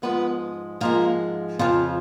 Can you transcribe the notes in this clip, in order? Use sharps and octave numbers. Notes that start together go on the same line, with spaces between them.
G#2 F3 G#3 B3 B4
G#2 F3 G#3 A#3 A#4
F2 C#3 F3 F4